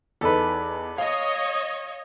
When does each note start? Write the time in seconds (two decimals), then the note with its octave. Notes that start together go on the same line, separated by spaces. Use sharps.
0.21 E2 D#4 A4 B4
0.98 C#5 D#5 F5